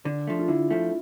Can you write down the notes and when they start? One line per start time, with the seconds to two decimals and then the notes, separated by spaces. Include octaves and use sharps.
0.05 D3 D4
0.27 F3 A3
0.39 F4
0.48 D3 E4
0.71 F3 A3